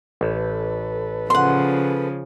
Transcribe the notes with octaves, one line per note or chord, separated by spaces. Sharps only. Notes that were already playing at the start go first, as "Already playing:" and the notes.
A1 A4 B4
C#3 F3 C#4 F#5 C6